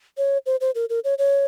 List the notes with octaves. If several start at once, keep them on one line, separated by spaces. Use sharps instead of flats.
C#5
C5
C5
A#4
A#4
C#5
C#5